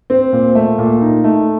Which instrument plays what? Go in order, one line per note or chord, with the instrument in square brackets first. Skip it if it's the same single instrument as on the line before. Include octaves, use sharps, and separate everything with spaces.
[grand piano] C4
A#2
A3
A#2
D#4
A3